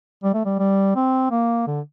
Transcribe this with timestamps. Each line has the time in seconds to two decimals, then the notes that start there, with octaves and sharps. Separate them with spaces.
0.24 G3
0.34 A3
0.45 G3
0.59 G3
0.96 C4
1.31 A#3
1.67 D3